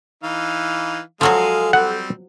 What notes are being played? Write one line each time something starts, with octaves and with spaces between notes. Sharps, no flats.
E3 D#4 F5
F3 F#3 G#3 F#4 A4 F5 G#5
G3 C4 F#5